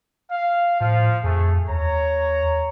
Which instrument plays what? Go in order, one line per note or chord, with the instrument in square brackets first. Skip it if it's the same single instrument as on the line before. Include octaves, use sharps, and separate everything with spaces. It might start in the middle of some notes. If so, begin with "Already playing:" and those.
[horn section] F5
[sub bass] A2 [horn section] F3 F5
[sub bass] F2 [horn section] A3 G#4
[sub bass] D#2 [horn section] C#5 A#5